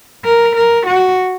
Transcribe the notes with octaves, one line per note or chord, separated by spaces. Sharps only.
A#4
A#4
F#4